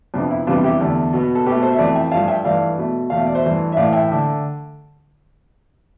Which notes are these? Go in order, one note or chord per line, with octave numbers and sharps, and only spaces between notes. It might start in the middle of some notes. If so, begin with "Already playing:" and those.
F2 C3 F3 B3 D4
E4
F2 C3 E3 G3 B3 D4 F4
E4 G4
E2 D3 A3
B2 B3
A4
B2 A3 G4 B4
A4 C5
E5
F2 E3 A3 B4 D5
E5 G5
G2 F3 A3 F5 A5
E5 G5
G2 E3 A3 D5 F5
B2 A3
E2 B2 A3 F5
E5
D5
C5 E5
G2 E3 A3
E5
A2 E3 A3 D5 F5
E5 G5
D3 A3